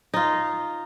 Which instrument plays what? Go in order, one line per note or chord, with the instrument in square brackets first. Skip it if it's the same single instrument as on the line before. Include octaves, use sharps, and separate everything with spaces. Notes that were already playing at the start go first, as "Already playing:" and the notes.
[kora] D#4 F4